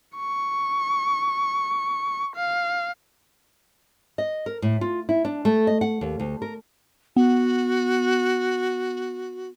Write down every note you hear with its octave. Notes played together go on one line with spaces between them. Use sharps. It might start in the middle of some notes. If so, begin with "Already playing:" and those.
C#6
F5
D#5
A#4
A2
F4
E4
D4
A3
D#5
F#5
D#2
D2
A#4
B3 F#4